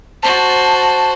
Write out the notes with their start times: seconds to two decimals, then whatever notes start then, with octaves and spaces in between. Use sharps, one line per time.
0.23 F#4 C5 A5